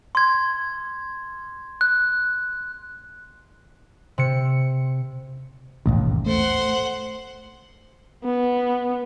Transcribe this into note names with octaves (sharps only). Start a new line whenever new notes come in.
C6 G#6
F#6
C3 C#7
A1 D#2 G#2 B2
A3 C5 F#5
B3